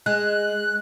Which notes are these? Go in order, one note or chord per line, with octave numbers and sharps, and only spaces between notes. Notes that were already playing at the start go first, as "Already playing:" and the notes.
G#3 F#6